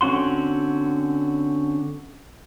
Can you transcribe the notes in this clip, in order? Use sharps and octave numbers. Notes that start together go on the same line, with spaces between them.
D3 C4 C#4 F#4 C6